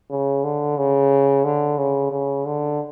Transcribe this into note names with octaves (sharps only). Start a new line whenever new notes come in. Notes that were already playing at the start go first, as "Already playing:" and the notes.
C#3
D3
C#3
D3
C#3
C#3
D3